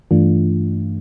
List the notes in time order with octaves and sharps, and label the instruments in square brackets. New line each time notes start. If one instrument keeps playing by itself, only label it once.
[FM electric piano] G2 E3 A3 D4 F4